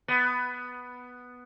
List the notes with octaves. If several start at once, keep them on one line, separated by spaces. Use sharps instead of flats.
B3